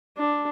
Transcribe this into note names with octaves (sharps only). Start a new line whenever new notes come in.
D4